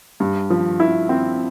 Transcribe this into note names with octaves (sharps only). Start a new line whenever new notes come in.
G2
F3
E4
C4